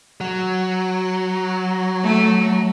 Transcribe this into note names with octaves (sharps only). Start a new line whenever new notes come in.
F#3
A3